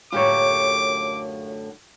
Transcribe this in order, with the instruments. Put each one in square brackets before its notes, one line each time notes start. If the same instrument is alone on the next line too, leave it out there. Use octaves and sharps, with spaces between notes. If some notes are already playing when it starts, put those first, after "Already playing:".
[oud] F#2 A2 D3 [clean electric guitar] F4 G4 C#5 [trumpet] D6